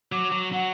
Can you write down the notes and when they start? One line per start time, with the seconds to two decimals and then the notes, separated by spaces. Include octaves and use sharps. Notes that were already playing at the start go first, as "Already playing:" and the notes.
0.12 F#3 D6
0.32 F#3
0.52 F#3 F#5